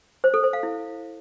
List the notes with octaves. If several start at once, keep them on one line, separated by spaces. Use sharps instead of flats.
C5
A4
C5
F5
E4